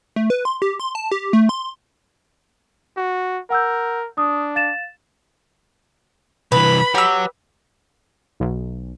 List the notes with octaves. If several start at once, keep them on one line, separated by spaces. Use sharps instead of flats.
A3
B4
C6
G4
C6
A5
G4
A3
C6
F#4
A#4 F#5 E6 G6
D4 D#6
F5 A6 E7
C2 E3 B4 B5
G4 C#5 F#5 E6
B1